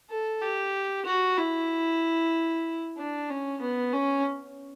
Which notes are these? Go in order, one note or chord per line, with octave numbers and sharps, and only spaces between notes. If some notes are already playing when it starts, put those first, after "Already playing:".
A4
G4
F#4
E4
D4
C#4
B3
C#4